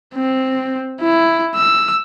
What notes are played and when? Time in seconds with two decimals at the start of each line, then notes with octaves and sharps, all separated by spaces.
0.15 C4
1.01 E4
1.56 E6